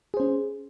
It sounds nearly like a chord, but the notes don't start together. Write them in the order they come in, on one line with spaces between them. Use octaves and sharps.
G#4 C5 C#4